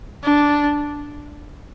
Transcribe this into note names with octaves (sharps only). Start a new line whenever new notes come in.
D4